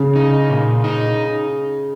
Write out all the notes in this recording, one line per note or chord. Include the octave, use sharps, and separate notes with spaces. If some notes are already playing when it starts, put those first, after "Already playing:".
Already playing: C#3
D#4
A#2
D#4